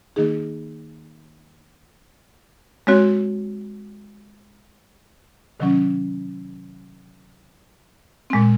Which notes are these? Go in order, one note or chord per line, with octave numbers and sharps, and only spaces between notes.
D#3 A#3 D#4 G#4
G#3 C4 F#4 C#5
C3 D#3 F#3 C#4
A#2 G#3 C4